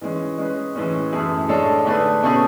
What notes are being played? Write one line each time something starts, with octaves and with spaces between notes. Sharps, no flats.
E3 G#3 C#4
G#3 C#4 G#4 B4
A2 E3 G#3 C#4
F#2 E3 A3 E4 G#4
A2 G#3 D4 A4 C#5
D3 A3 D4 G#4 B4
B2 A3 C#4 G#4